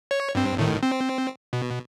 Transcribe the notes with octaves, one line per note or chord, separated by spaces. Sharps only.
C#5
G2 C4
G1 A2 D#3
C4
B2